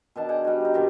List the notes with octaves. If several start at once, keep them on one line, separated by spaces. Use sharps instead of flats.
B2 D#3 D4 A5
G#4 F#5 G5
G3 F#4
D#4 B4
G2 C3 D#3 G4